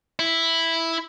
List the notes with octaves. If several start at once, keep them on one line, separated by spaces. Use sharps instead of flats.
E4